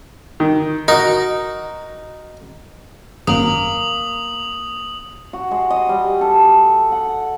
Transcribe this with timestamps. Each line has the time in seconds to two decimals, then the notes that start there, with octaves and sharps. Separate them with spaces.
0.40 D#3
0.88 D#4 F#4 A#4
3.27 G#1 F#2 F#3 A#3 D#6 F#7
5.33 F#4
5.51 G#3
5.70 D#5
5.89 G3
6.21 A4
6.43 A4
6.92 F#5